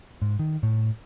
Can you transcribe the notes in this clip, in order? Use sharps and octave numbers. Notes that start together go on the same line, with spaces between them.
G#2
D#3
A2